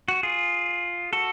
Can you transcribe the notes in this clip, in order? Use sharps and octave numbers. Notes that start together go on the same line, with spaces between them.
F#4
F4 G#4
F#4 A4